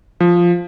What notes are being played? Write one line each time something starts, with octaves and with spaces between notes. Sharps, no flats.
F3